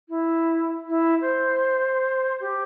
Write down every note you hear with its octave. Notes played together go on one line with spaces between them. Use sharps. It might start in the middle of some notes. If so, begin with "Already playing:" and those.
E4
E4
C5
G4